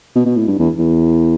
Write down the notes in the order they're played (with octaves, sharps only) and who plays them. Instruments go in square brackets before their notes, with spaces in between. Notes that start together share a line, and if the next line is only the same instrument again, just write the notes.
[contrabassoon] B2
B2
A2
G2
E2
E2